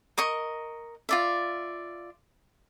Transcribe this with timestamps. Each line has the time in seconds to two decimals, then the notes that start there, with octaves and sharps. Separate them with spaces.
0.18 A#4 D#5 C#6
1.09 F4 D5 E5